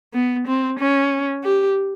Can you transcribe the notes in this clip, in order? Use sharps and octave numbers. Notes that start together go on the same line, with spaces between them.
B3
C4
C#4
G4